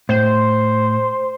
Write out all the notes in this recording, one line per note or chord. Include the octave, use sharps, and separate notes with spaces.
A2 C5